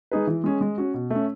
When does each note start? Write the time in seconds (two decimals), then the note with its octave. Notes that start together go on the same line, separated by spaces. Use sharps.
0.12 G#3 D#4 G#4 B4
0.27 E3
0.44 G#3 C#4 G#4
0.61 G#3
0.78 C#4 F#4
0.94 B2
1.10 A3 C#4